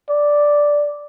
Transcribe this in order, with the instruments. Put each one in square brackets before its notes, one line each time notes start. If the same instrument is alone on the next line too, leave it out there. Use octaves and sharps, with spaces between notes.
[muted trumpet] D5